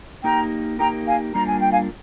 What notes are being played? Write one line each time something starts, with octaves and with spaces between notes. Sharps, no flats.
A#3 D#4 G4 A#4 G5 A#5
A#3 D#4 G4 A#4 G5 A#5
F5 G#5
G3 A#3 D4 F4 A#4 A#5
G#5
G5
F5 G#5